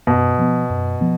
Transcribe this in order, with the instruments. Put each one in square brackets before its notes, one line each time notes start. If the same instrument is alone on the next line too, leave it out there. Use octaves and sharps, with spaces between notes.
[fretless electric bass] F#2 [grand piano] B2
[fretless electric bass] F3 B3
F#2
F3 B3